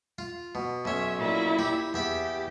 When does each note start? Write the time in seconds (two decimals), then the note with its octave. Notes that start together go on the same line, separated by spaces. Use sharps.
0.18 F4
0.55 B2
0.85 B1 C#4 E5
1.18 A#2 E4
1.59 G4
1.94 E2 G4 E5 B5